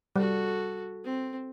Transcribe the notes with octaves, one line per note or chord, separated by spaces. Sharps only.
G3 F#4 A4
C4